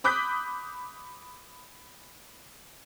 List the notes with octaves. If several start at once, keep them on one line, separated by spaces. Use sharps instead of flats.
B5 D6 D#6 F#6 G6 B6